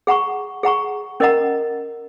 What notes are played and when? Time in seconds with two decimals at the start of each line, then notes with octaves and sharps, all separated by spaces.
0.07 G#4 F#5 A#5 C#6
0.63 G#4 F#5 A#5 C#6
1.20 C#4 A#4 D#5 F#5 A#5